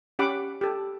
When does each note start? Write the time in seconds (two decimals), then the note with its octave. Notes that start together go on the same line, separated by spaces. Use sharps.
0.19 C#4 G4 F#5 B5 D6
0.61 G4 A4